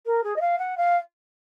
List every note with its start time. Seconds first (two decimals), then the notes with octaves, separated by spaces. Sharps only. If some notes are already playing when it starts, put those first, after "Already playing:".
0.06 A#4
0.23 G#4
0.36 D#5
0.41 F5
0.58 F#5
0.77 F5